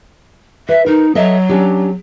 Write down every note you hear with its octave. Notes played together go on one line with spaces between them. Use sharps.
B4 E5
D#4 A#4
F#3 A4 D#5 E5
C#4 D4 G4